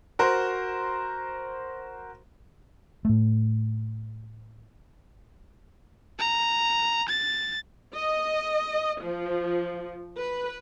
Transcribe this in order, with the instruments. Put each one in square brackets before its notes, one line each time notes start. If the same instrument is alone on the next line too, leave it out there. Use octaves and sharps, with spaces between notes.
[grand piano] F#4 A#4 C5
[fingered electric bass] A2 A3
[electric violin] A#5
A6
[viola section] D#5
F3
B4